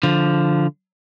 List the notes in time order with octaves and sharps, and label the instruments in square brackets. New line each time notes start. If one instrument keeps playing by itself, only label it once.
[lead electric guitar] D3 F3